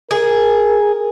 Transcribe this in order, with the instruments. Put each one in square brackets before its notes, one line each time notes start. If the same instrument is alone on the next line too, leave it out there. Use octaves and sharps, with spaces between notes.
[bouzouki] G#4 [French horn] A#4